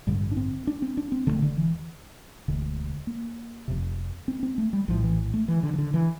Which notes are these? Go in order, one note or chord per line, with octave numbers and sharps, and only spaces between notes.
A1 G2 D3 G3
D4
C4
D4
C4
D4
C4
E1 E2 D3 A3
D3
E3
E1 D2 D3
A#3
F1 F2 C3
C4
C4
A3
G3
A#1 A2 F3
E3
A3
E3
D3
E3
D3
E3